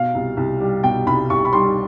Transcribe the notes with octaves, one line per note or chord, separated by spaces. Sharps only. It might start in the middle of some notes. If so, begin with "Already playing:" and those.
Already playing: B2 F5
C2
C2
G3
B2 G5
C2 B5
C2 C#6
B5
G3 C6